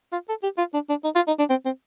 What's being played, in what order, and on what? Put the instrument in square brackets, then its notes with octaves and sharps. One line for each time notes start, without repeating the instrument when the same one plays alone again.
[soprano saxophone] F4
A4
G4
F4
D4
D4
D#4
F4
D#4
D4
C4
C4